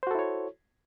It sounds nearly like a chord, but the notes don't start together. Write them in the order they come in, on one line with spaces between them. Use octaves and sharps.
C5 F#4 A4 E4 C#5